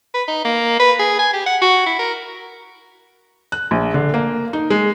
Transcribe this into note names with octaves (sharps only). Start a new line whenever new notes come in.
B4
D#4
A#3
B4
G#4
G#5
G4
F#5
F#4
E4
A#4
F#6
A#1
D3
A#3
D#4
G#3